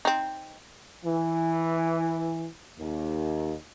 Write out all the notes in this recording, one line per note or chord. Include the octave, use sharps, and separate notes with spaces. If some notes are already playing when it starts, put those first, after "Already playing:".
C4 D#4
E3
D#2